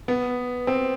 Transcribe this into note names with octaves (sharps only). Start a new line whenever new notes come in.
B3
C4